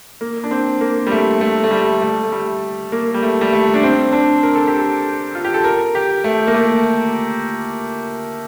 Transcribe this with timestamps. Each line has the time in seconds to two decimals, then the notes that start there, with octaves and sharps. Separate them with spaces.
0.21 A#3
0.44 D4
0.51 C4
0.81 A#3
1.07 G3
1.12 A3
1.41 A3
1.64 A3
1.71 G3
2.02 A3
2.23 A3
2.32 G3
2.92 A#3
3.14 G3
3.22 A3
3.41 G3
3.53 A3
3.74 D4
3.83 C4
4.13 D4
4.43 A#4
4.56 A4
4.67 G4
4.79 A4
5.35 F4
5.45 G4
5.54 A4
5.64 A#4
5.95 G4
6.24 A3
6.47 A#3
6.54 A3